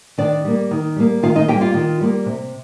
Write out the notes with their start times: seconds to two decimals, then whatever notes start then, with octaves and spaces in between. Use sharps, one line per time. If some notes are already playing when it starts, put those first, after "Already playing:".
0.18 D#3 D4 D5
0.44 G3 A#3
0.71 D#3
0.96 G3 A#3
1.23 D#3 F4 F5
1.35 D#4 D#5
1.48 A#3 G4 G5
1.53 G3
1.61 F4 F5
1.74 D#3
2.00 G3 A#3
2.26 C3